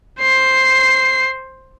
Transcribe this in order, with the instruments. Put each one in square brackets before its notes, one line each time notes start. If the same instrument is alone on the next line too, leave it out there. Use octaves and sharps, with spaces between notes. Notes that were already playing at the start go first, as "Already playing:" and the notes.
[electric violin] C5 C7